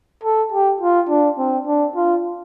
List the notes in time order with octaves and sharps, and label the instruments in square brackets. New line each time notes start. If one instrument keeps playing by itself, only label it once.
[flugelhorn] A4
G4
F4
D4
C4
D4
F4